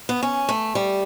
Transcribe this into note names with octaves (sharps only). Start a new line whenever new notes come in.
B3
C#4
A3
G3